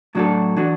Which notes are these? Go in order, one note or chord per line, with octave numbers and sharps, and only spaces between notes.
A2 F#3 D4 F#4 A4
E3 D4 F#4